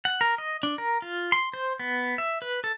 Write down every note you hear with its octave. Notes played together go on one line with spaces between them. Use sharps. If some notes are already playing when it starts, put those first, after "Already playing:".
F#5
A#4
D#5
D4
A#4
F4
C6
C5
B3
E5
B4
A4